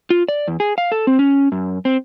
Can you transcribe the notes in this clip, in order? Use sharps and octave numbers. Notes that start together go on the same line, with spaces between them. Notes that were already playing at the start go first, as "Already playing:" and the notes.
F4
D5
E2
G#4
F5
A4
C4
C#4
F#2
C4